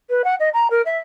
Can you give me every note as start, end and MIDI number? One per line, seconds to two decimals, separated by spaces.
0.10 0.22 71
0.24 0.35 78
0.40 0.49 75
0.54 0.68 82
0.71 0.82 70
0.86 0.99 76